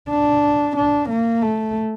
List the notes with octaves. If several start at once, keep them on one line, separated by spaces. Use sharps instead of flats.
D4
D4
A#3
A3